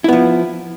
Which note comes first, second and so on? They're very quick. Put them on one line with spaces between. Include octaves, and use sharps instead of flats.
E4 B3 F3